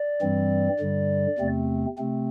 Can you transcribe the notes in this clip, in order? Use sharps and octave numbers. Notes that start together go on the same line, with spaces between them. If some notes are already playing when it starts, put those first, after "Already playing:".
Already playing: D5
G2 E3 G3 C4
G2 D3 G3
E2 C3 A3 C4
C3 A3 C4